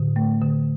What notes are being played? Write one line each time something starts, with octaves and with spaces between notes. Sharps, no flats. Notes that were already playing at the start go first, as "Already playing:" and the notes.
Already playing: A2 D3
A3
D3